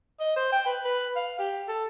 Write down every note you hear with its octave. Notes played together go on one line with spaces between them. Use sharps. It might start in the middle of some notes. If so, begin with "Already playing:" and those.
D#5
C5
G5
B4
B4
F5
G4
A4